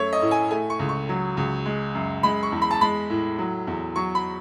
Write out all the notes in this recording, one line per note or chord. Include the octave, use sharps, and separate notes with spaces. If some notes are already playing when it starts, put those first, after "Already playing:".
Already playing: F#2 A3 C#5
D#5
A2
G#5
A3 G#5
C#6
C#2
C#6
F#3
C#2
G#3
F#2
G#3 B5
C#6
E2
B5
A5
G#3 B5
A2
F#3
E2
F#3 C#6
B5